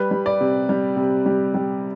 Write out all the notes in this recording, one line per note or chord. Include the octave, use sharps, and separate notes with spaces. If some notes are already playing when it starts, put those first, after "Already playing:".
Already playing: G3 B4
G3
D5
C3
G3
C3
G3
G3